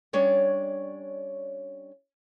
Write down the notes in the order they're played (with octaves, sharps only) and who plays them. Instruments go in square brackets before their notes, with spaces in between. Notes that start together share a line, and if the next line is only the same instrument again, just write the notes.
[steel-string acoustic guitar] G3 C#4 D4 C#5 D5